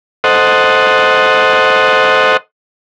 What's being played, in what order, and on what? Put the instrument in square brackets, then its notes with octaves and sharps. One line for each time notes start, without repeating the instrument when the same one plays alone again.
[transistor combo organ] A4 C5 D#5 F#5